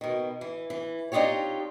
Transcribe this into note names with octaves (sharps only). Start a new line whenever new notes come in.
B2 D#3
E3
E3
C4 D4 D#4 F4 G4 C#5